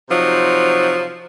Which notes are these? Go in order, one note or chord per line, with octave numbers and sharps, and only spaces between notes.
C3 F3 F#3 D#4